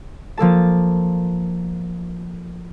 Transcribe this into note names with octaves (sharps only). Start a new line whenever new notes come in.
F3 A#3 A4 A5